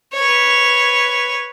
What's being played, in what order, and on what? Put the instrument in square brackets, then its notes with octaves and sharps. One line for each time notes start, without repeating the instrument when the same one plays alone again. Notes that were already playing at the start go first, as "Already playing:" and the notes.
[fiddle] B4 C#5